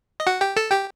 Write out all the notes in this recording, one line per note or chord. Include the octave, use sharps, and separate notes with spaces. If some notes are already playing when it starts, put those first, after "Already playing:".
D#5
F#4 F#5
G4 G5
A4 A5
G4 G5